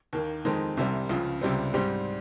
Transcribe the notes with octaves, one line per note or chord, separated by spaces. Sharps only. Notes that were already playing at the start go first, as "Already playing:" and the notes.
D#2 D#3 A#3
F2 D#3 G#3 C4 D#4
C2 C3 G3 C4
C#2 C#3 F3
C#2 C3 G3 C4
G#2 G3 C4 G4